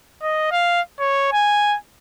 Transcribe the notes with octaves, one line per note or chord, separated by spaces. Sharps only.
D#5
F5
C#5
G#5